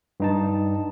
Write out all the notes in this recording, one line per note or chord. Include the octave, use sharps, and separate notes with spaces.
G2 D#4 A5